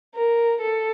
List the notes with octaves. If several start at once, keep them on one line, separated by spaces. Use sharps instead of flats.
A#4
A4